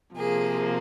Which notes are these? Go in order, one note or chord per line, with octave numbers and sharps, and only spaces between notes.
C3 F3 A#3 G#4